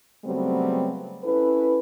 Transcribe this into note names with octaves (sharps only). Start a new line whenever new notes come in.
C#3 F#3 G3 A3 B3 C4
C#4 E4 A4 B4